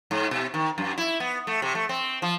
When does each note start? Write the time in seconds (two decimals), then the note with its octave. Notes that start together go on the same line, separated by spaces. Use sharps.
0.11 G#2
0.31 B2
0.54 D#3
0.78 F#2
0.98 E4
1.20 B3
1.47 A3
1.62 C3
1.75 A3
1.89 C4
2.22 F3